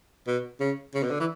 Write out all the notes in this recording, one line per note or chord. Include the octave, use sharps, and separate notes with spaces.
B2
C#3
C#3
B2
D3
E3